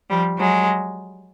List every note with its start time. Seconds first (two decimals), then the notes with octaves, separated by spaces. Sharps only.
0.09 F3 G3
0.38 F#3 G#3